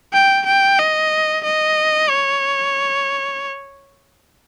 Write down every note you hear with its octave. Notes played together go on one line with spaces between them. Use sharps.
G5
G5
D#5
D#5
C#5